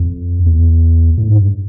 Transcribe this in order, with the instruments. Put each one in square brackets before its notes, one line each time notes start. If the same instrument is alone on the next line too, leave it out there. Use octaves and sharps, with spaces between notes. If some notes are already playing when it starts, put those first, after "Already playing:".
Already playing: [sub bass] F2
E2
A2
G#2
G2